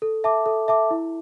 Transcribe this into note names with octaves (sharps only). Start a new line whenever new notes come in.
A4
E5 A5 D6
A4
E5 A5 D6
E4